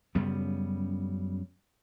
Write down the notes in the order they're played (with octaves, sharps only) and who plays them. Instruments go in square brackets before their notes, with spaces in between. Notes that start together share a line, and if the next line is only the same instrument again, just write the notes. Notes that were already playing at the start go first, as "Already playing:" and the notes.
[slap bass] F#2 C#3 G3 B3